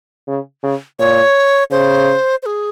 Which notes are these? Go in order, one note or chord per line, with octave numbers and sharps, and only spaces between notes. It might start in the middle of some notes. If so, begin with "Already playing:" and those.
C#3
C#3
A#2 C#5
C#3 C5
C5
G#4